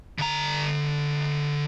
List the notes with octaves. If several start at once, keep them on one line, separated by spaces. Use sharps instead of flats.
D3 A#5